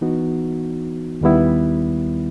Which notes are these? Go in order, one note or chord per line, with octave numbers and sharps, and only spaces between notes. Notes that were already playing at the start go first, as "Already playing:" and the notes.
E3 B3 D#4 F#4
D#2 D#3 G3 B3 E4